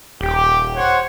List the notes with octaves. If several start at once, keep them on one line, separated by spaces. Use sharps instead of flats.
D#1 G4
C5 C#5 F#5